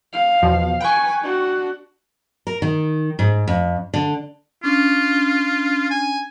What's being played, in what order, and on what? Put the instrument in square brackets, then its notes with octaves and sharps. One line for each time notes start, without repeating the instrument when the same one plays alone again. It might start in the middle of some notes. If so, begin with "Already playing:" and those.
[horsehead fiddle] F5
[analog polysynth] E2 B2 F3
[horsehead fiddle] B4 G#5 [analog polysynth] G5 C#6
[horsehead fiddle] D4 F#4
[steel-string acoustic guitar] A#4
D#3
G#2
F2
D3
[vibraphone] C#4 D4 [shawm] F4
[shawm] G#5